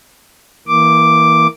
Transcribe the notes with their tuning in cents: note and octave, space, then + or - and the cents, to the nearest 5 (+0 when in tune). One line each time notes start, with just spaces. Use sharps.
E3 -15 A#3 +5 D6 +0